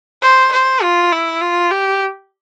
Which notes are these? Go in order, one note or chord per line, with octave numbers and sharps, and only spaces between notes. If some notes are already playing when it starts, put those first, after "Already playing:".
C5
C5
F4
E4
F4
G4